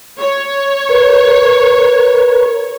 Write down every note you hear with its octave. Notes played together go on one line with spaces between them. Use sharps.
C#5
A#4 B4